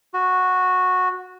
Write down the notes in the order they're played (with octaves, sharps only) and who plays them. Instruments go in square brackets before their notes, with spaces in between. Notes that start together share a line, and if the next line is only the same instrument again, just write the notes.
[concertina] F#4